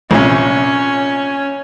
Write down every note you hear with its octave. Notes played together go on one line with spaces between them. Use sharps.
A#1 C3 C#4